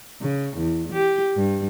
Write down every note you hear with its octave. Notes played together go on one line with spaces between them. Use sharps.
C#3
E2
G4
G2